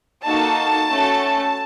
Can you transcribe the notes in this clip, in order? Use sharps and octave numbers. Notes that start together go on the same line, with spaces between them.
A#3 D#4 F#4 A4 A5
A3 C#4 F#4 A4